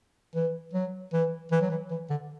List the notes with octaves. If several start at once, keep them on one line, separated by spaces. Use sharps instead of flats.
E3
F#3
E3
E3
F#3
E3
E3
D3